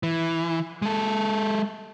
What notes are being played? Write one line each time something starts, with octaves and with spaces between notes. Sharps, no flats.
E3
G#3 A4